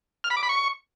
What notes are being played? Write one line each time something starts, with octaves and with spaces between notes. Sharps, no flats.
F6
B5
D6
B5
C#6